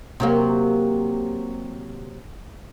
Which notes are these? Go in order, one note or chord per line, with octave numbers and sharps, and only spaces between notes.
C3 F#3 A#3